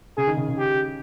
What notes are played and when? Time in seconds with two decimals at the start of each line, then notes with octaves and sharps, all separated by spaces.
0.17 C#3 G#4
0.27 D#3
0.37 C#3
0.48 C#3
0.58 G4